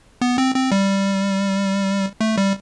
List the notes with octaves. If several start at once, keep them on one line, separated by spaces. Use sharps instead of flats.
B3
C4
C4
G3
A3
G3